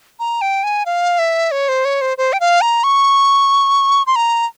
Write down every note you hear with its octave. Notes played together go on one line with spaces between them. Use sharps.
A#5
G5
G#5
F5
E5
C#5
C5
C#5
C5
C5
G5
F5
A#5
C#6
C6
A#5